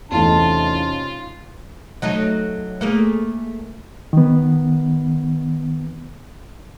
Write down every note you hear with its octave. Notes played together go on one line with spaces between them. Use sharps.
E2 C3 A3 C#4 D#4 F4 A5
F#3 A3 D#4
A3 A#3 G#4
D#3 B3